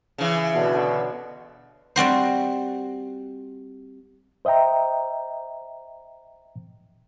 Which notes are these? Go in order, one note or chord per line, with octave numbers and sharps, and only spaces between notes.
C#3 E3
B2 D3
G3 C4 F#4 C5
C5 D#5 E5 G5 A#5